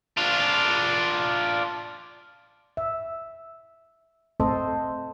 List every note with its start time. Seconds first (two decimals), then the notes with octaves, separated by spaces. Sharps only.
0.17 D4 F4
2.77 E5
4.40 A3 C4 A4 C5 D#5